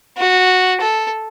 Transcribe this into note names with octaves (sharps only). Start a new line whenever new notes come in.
F#4
A4